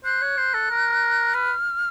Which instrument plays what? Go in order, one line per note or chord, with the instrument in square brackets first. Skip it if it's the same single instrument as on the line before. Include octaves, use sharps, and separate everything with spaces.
[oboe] C5 [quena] F#6
[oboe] C#5
C5
A4
A#4
[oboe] B4 [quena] F6